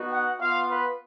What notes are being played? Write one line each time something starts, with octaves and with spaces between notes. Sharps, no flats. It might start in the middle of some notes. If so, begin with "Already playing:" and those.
Already playing: B3 D#4 F#4
F#5
B3 F4 F5
B4